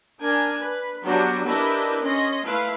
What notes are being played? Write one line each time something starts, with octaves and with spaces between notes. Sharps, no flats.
D4 A#4 G#5
B4
F#3 G3 B3 D4 F#4 G4
D4 E4 G4 A#4 B4 D#5
C#4 D#5 C6
A3 E4 B4 F5